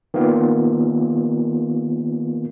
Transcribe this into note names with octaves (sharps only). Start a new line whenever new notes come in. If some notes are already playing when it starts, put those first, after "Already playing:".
D#3 A#3 B3 F4